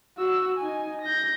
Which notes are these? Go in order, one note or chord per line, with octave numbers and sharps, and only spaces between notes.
F#4 E6
D#4 G#5
G6 A#6